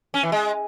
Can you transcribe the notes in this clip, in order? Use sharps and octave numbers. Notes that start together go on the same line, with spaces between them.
C#4
E3
G#3